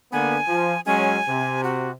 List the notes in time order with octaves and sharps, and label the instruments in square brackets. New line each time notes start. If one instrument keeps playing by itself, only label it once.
[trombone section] D3 A#3 B3 [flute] G#5
[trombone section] F3
[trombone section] F#3 G#3 C#4 [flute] G#5
[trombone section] C3
[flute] F#4